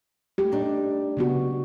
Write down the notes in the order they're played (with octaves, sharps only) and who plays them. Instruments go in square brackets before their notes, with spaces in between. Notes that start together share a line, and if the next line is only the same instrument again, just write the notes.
[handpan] A3 G4
[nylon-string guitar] D4 D#4
[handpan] C#3 B3 F#4